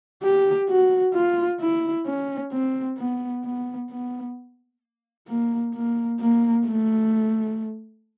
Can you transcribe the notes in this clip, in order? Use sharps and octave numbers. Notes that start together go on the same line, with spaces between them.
G4
F#4
F4
E4
C#4
C4
B3
B3
B3
A#3
A#3
A#3
A3